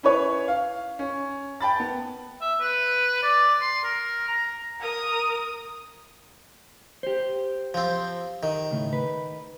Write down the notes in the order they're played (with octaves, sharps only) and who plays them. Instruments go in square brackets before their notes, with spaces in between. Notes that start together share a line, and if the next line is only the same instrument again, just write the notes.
[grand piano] C#4 E4 B4 C#5
F5
C#4
G5 A5 B5 A6
B3
[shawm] E5
B4
D5
C6
A#4
A#5
[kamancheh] A#4 D#6
[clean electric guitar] G4 C5
[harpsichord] F3 C4
D#3
[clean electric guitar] A2 C#3
B4